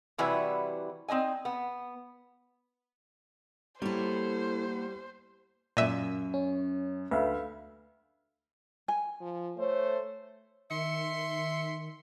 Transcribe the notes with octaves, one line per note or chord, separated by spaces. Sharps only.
C3 E3 G3 E4 F#4 B4
C4 D#4 D#5 G#5
B3
G3 A#3 B3 E4 A4 C5 C#5
F#2 A#2 E5 D#7
C#4
D2 B4 E5 F5
G#5
F3
A3 C5 C#5
D#3 E5 C6 C#7